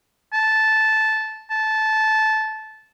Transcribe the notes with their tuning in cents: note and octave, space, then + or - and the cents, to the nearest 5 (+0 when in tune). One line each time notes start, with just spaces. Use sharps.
A5 -10
A5 -15